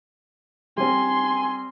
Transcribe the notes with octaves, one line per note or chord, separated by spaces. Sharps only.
G3 C4 G#5 C6